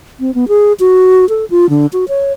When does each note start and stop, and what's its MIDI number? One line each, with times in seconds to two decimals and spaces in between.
0.20 0.34 60
0.34 0.48 59
0.48 0.73 68
0.80 1.28 66
1.29 1.45 69
1.50 1.69 65
1.70 1.86 50
1.93 2.05 66
2.08 2.33 73